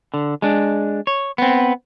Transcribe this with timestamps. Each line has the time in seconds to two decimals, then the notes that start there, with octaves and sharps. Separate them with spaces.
0.14 D3
0.42 G#3 D4
1.07 C#5
1.38 B3 C4